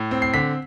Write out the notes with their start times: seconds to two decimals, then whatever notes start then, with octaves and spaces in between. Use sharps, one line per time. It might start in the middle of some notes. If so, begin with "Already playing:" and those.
Already playing: A2
0.11 C4
0.22 C7
0.34 D3 B6